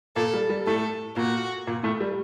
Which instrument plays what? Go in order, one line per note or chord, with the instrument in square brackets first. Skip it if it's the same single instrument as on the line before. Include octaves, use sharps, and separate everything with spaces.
[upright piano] A#2 A#3 [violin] A4
[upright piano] G3
G3
[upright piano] A2 A3 [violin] A4
[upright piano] A#2 A#3 [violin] F#4
[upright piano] A#2 A#3
A2 A3
G3